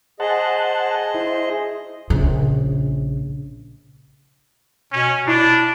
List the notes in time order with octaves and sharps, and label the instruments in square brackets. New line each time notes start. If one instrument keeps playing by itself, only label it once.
[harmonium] G#4 D#5 [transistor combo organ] C5 F#5 A5
[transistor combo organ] E4 C5
[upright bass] A#1 C#3
[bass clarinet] B2 [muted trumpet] C#4
[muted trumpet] D4 [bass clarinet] E4